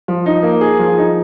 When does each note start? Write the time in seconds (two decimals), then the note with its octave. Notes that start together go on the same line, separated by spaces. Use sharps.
0.08 F3
0.26 D#4
0.43 A#3
0.61 G#4
0.79 F3
0.98 D#4